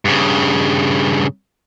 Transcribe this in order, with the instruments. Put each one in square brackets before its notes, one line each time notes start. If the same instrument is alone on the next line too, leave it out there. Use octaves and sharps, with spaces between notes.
[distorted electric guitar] G2 C#3